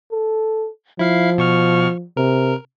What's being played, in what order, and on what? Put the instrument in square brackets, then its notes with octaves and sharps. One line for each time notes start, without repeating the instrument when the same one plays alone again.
[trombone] A4
[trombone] F3 [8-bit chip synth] E4 F5 C7
[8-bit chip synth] B2 C#6 F6
[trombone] C3 [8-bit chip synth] A#4